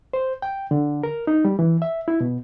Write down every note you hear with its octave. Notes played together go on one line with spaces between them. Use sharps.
C5
G5
D3
A#4
D#4
G3
E3
E5
E4
B2